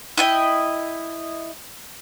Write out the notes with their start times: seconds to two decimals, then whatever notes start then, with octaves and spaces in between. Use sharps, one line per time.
0.18 E4 D#5 G5